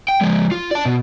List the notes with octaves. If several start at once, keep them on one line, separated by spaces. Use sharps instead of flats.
G5
F3 G#3
F4
D5 A5
B2